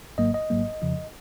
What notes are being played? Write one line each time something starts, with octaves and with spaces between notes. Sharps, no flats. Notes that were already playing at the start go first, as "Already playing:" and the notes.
G#1 G#2 F#3 A#3 D#5
D#5
G#1 G#2 F#3 A#3
F2 C#3 F3